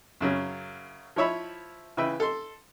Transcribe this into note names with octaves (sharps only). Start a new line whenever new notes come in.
F#2 C#3 F#3
F3 E4 C#5 E5 B5
C#3 E3 B4 E5 G5
A4 C6